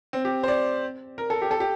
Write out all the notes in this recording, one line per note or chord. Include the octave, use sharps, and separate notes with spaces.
C4
G4
C5
D5
A#4
A4
G4
A4
G4